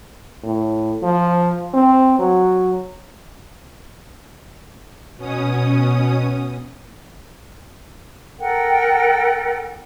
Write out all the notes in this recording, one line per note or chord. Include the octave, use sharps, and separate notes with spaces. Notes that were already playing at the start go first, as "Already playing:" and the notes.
A2
F3
C4
F#3
B2 C#4 D#6
A4 A#4 F#5 G5